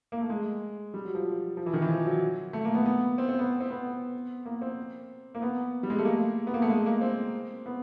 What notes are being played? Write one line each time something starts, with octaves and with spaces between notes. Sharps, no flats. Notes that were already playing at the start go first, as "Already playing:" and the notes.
A#3
A3
G#3
G3
F#3
F3
F3
E3
D#3
E3
F3
F#3
A3
A#3
B3
B3
C4
C4
B3
C4
B3
A#3
C4
A#3
B3
G3
G#3
A3
A#3
B3
A#3
A3
G#3
A#3
C4
B3